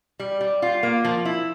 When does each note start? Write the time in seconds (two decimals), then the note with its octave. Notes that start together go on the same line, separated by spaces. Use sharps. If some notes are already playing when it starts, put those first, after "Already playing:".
0.20 G3
0.41 G3
0.62 F4
0.83 A#3
1.05 F3
1.25 E4